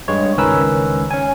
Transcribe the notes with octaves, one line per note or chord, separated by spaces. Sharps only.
G2 G#3 C#5
C#2 D#3 C#4 A#4 B4 E6
C#4 G#5